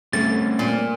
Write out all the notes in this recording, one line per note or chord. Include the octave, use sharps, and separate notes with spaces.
G3 A3 C4 C#4 A6
A#2